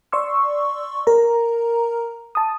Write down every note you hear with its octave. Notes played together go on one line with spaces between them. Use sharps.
D5 C6 C#6 E6
A#4 A#5
A5 D#6